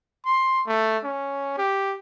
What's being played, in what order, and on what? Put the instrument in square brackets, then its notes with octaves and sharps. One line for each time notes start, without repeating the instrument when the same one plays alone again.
[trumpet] C6
A3
C#4
G4